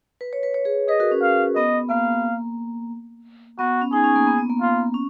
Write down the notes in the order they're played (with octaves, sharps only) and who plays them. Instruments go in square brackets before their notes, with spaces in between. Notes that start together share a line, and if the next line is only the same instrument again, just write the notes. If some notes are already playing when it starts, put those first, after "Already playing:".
[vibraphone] B4
C#5
B4
C#5
G#4 B4
[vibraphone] G#4 B4 [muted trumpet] D#5
[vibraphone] F#4 A#4
C#4
[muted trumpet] F5
[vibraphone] B3 [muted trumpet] D#5
[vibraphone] A#3 [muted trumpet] F5
[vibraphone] B3 [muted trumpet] F#4
[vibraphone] C#4
[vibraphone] D#4 [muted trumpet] G#4
[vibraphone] C#4
A#3
B3
B3
A#3
[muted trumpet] F4
[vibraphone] C#4